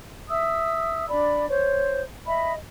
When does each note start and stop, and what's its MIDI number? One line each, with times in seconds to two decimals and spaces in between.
0.28 1.06 76
0.28 1.06 87
0.28 1.06 88
1.08 1.46 62
1.08 1.46 74
1.08 1.46 83
1.48 1.98 72
1.48 1.98 73
2.26 2.52 75
2.26 2.52 76
2.26 2.52 83